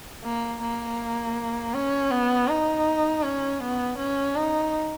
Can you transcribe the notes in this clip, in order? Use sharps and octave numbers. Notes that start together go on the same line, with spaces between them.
A#3
A#3
C#4
B3
D#4
C#4
B3
C#4
D#4